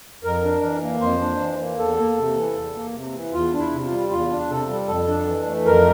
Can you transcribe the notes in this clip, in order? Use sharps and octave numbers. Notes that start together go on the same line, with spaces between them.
F2 A#4
D4
E3
A#3
F2 C5
D4
E3
A#3
E2 A4
A#3
C3
E3
E2
A#3
C3
E3
E2 F4
D4
E4
C3
F4
G3
E2 F4
D4
C3 A4
G3
F2 A4
D4
E3
A3
F2 A#4